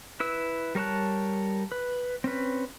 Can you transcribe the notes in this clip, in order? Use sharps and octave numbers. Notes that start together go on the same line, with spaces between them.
E4 B4 E6
G3 A#4 C#5 A5 F#6
B4
C4 C#4 B4